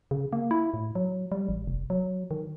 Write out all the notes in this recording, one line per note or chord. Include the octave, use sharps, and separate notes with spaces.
C#3
A#3
E4
A2
F#3
G3
A1
F1
F#3
D#3